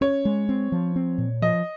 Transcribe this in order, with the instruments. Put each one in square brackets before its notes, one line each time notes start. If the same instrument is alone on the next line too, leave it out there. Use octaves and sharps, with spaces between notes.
[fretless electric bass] C#4 [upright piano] C#5
[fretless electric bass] G#3
C4
F3
C4
A#2
[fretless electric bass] F3 [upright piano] D#5